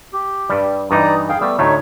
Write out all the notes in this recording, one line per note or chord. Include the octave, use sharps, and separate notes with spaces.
G4
G2 G3
G2 E3 D#4 D5 A#5 D#6
G#4 F5 G5
G3 A3 B3 E6
D2 A2 A3 D#4 C#5